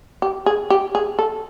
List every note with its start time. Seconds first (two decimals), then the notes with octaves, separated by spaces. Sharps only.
0.22 G4
0.46 G#4
0.70 G4
0.95 G#4
1.19 A4